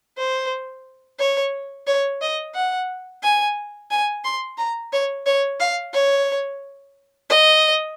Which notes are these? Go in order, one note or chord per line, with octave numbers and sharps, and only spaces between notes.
C5
C#5
C#5
D#5
F#5
G#5
G#5
C6
A#5
C#5
C#5
F5
C#5
D#5